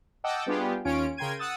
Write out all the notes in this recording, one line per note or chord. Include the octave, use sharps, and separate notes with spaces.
D#5 F#5 G5 A5 D6 E6
G3 B3 D4 F4 G4 G#4
D#2 C#4 F4 C#5 D7
C#3 A#4 G5 C6 G#6 D#7
F#5 D#6 E6 A6